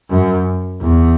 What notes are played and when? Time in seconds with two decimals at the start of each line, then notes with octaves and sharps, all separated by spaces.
0.10 F#2
0.81 E2